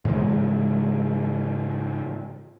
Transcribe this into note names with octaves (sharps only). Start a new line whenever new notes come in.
G#2 C#3 E3 G#3